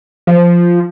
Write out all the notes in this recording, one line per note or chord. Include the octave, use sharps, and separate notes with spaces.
F3